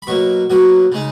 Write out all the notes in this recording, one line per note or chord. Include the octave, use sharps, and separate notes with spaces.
B5
B2 F#3 A#3 C#6
B2 F#3 A#3 F#5
C#3 G#3 D#4